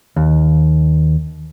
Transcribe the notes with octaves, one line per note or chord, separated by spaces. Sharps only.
D#2